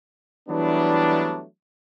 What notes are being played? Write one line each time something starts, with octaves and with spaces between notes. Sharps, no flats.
E3 F#3 G3 A3 B3 D4